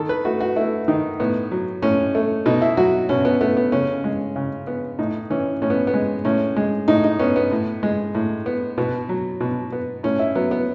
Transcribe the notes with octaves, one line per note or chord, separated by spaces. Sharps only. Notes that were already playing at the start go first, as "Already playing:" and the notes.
Already playing: D#3 A4
B4
A3 F#4
F#4
A3 E4
D#3 D#4
A2 B3
F#3
A2 C#4
A3
B2 D#4
E4
F#3 F#4
B2 C#4
B3
A3 B3
B3
C#3 C#4
G#3
C#3
B3
A2 D#4
E3 C#4
A2 C#4
B3
B3
G#3
A2 C#4
G#3
A2 D#4
D#4
B3 C#4
B3
A2
G#3
A2
B3
B2 B3
F#3
B2
B3
A2 C#4
E4
F#3 B3
B3